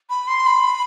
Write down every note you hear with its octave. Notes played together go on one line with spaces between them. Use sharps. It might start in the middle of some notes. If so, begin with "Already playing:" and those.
B5
C6
B5